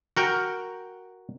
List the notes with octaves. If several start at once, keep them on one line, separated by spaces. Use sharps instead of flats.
F#4 A#4 G5